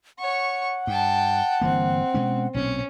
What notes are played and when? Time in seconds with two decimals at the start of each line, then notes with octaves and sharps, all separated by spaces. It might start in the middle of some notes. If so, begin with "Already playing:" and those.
0.19 C#5 F#5 C#6
0.87 G2 G5 A5
1.62 G1 E3 A#3 C4
2.14 B2 G#3 C#4
2.54 B1 A#2 C4 C#4